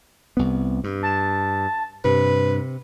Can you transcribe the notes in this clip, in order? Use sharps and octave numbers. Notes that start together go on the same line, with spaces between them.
C2 B3
G2
A5
G2 C3 B4